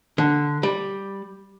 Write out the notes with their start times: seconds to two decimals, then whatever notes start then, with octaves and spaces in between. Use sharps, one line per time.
0.18 D3
0.63 G3